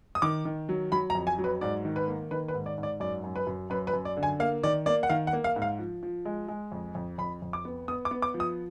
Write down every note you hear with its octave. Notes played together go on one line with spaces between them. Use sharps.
D#6
D#3 D6
D#3
F#3
F#3 B5
A#5
F2
G#5
F#3
B4
G#2 D5
D#3
B4
A#3
D#3 B4
B4
G#2
D5
G#2
D5
F#2 D5
F#2
B4
F#2
F#2 B4
B4
F#2
D5
D3
G#5
A#3 F5
D#3 D5
A#3 D5
F#5
D#3 F5
F#5
A#3
F5
G#2
F5
F3
F3
G#3
G#3
F2
F2
F2 B5
F2
D6
B3
B3 D#6
D6
B3
D6
F3
D#6